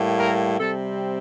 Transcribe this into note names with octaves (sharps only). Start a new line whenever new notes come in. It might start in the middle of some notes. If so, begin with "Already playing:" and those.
Already playing: A2 G3 A#3
A#4
C3 G3 C4 A4